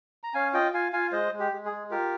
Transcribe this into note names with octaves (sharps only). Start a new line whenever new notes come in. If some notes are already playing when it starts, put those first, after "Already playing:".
A#5
C#4 F5 G#5
F4 D#5 G5
F4 F5 G#5
F4 F5 G#5
G#3 C5 D#5
G#3
G4
G#3
G#4
G#3
F4 G4 A#4